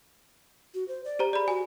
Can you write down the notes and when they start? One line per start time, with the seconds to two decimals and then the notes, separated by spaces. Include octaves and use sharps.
0.74 F#4
0.88 C5
1.05 D5
1.19 G4 C5 A#5
1.33 G#4 D5 B5
1.48 F#4 G#5